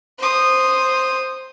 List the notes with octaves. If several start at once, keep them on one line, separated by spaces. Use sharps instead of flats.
C5 D#6